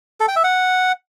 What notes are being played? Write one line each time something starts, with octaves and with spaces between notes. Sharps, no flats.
A4
G5
E5
F#5